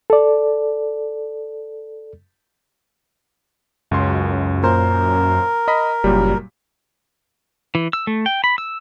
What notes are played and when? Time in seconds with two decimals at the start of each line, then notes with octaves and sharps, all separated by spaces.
0.10 A4 D5
3.91 C#2 F#2 C6
4.63 A#2 A#4 C5 C6
5.68 D#5 B5 B6
6.04 F#1 A#2 F#3 G3
7.75 E3
7.93 E6
8.07 A3
8.26 G5
8.44 B5
8.58 E6